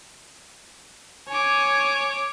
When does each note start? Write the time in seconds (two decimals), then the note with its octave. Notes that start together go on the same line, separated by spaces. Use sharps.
1.29 C#5 G#5 D6